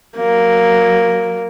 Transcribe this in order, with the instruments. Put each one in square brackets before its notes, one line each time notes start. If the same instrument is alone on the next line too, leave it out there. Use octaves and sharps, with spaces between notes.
[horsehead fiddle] F#3 A#3